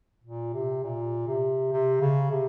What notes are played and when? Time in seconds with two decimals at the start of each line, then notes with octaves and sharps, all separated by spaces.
0.24 A#2
0.54 C3
0.83 A#2
1.27 C3
1.72 C3
2.01 C#3
2.31 C3